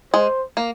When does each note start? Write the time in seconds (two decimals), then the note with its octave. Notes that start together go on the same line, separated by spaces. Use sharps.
0.14 G#3 C5
0.57 A#3